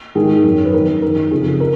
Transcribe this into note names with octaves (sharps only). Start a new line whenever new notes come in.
G#2 D#3 G#4
F#2 D#3
B4
F#2 D#3 A#4
F#2 D#3 A#4
F2 C#3 G#4
A#4